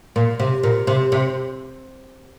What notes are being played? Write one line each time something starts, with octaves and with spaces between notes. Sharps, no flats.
A#2
C3
A#2
C3
C3